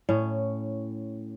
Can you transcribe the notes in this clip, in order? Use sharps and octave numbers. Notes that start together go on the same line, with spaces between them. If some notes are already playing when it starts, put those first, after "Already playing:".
A2 C#4